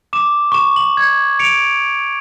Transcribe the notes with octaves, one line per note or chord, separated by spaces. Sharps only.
D6 E7
C#6 E7
F#7
G#6
C#7 D7 F7